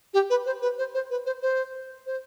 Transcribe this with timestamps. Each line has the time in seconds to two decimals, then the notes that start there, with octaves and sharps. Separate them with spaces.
0.14 G4
0.30 B4
0.46 C5
0.62 B4
0.78 C5
0.94 C5
1.10 B4
1.26 C5
1.42 C5
2.06 C5